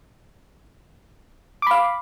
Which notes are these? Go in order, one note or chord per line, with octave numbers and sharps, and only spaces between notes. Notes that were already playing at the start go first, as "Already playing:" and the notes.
F5 B5 D6